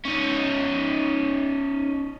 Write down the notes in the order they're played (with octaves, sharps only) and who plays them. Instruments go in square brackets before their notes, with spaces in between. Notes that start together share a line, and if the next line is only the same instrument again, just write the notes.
[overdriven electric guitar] C#4 D#4